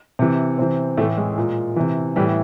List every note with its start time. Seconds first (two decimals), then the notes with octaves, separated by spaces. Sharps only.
0.19 C3 E3
0.58 C3 E3 C4
0.97 A2 A3
1.00 E3
1.17 G#3
1.38 A#2
1.76 C3 E3
2.16 A2 E3 G3